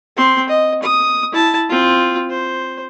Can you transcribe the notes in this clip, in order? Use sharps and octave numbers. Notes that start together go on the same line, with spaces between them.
C4 C6
D#5
D#6
E4 A5
C4 F4
C5